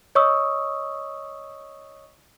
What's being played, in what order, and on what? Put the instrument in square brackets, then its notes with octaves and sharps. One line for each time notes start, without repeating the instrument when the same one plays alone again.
[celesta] C#5 D#5 C#6 D#6 E6